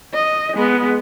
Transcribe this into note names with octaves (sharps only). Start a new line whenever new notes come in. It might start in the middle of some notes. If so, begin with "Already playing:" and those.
D#5
G#3 B3